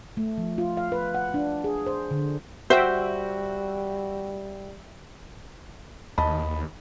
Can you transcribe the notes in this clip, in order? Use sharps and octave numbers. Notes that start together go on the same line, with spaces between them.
A3
F3
F4
F5
B4
F#5
D4
G#4
C5
D3
G3 F#4 C5 E5 G5
D#2 D#5 A5 B5